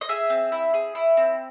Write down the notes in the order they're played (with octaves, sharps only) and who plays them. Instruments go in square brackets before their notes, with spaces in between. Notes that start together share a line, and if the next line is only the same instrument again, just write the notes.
[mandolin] D#5
G#4 E5
C4
E4
G#4
E4
C4